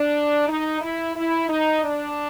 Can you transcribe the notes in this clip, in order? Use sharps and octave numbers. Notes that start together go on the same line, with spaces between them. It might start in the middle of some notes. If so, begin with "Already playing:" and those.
Already playing: D4
D#4
E4
E4
D#4
D4